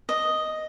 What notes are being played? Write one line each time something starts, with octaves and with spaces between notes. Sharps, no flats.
D#5